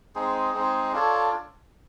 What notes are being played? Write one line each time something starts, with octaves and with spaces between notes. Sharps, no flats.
G#3 C4 D#4 G#4
G#3 C4 D#4 G#4
D4 F4 A4 C#5